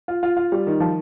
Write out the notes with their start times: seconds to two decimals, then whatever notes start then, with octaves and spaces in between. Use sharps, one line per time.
0.08 F4
0.23 F4
0.37 F4
0.52 G3
0.67 D#3
0.80 F3